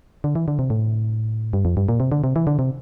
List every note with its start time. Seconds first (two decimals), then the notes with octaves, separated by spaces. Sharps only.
0.24 D3
0.35 E3
0.48 D3
0.59 C3
0.70 A2
1.53 G2
1.65 F2
1.77 G2
1.89 A#2
2.00 C3
2.12 D3
2.24 C3
2.36 E3
2.47 D3
2.59 C3